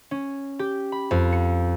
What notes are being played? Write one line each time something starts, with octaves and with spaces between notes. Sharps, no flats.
C#4
G4
B5
F2
C#7